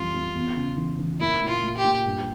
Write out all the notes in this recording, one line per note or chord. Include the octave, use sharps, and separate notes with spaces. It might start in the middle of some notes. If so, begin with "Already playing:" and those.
Already playing: F2 E3 F3 G3 F4
F2
E2
C#3
E3
E3
A#3 E4
A#2
F4
A#2
G4
A#2
G2